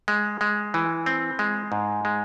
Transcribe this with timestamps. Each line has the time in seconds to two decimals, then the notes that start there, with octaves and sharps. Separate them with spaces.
0.08 G#3
0.41 G#3
0.74 E3
1.06 C4
1.39 G#3
1.72 G#2
2.05 G#3